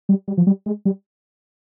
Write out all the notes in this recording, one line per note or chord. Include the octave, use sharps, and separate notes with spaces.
G3
G3
F3
G3
G#3
G3